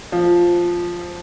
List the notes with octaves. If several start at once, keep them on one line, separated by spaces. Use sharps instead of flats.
F3